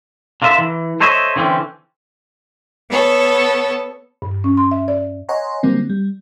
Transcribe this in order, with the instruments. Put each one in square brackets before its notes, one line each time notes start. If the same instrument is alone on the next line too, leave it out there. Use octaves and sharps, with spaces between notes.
[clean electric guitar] D3 F4 A#4 D#5 E5
E3
A4 C5 C#5 D#5 E5
D3 E3 C4 C#4
[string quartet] B3 A4 C#5
[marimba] G2
C#4
C6
E5
D5
[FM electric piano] C#5 D#5 F#5 G#5 A#5 C6
D3 F#3 G3 A#3 C4
G3